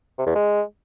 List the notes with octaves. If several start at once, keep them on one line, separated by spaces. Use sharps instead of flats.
C3
E2
G#3